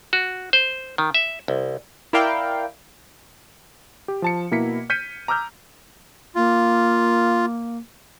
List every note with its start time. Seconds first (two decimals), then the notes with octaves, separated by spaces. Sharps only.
0.13 F#4
0.53 C5
0.98 D#3
1.14 E5
1.48 C2
2.13 E4 A#4 D5 F5 G5
4.08 G4
4.22 F3 A5 C#7
4.51 B2 A#3 E4 B6 C#7
4.90 F6 G6 G#6 B6 C#7 D#7
5.28 A#5 D6 E6 F6 G6
6.35 A#3 F4